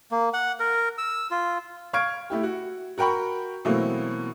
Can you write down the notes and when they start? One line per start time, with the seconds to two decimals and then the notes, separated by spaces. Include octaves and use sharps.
0.11 A#3
0.33 F#5
0.60 A#4
0.98 E6
1.31 F4
1.93 F5 C#6 F6 G#6 D7
2.30 A3 E4 G4
2.43 F#4
2.98 F#4 A#4 G5 B5 C#6
3.65 B2 E3 F#3 A3 A#3 C4